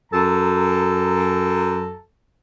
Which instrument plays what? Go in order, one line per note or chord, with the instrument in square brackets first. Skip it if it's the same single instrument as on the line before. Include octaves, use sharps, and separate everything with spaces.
[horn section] F#2 A4 A#5